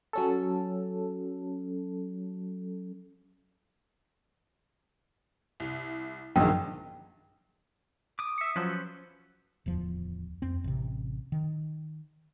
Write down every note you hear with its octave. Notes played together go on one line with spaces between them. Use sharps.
F#3 C#4 A4
C2
A#1 F#2 D3 D#3 G#3 G5
D6 D#6
E5 C#7
F3 F#3 C#4 B4 C5
D1 E2 F3
F2 C4
A1 C3
D#3